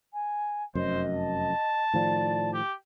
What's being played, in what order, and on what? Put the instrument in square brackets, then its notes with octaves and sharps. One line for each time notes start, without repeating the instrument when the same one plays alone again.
[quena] G#5
[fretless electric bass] F1 F#2 [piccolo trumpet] C5 [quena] D#5
[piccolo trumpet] A5
[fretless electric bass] A2 D#3 F3 [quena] D5
[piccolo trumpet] G4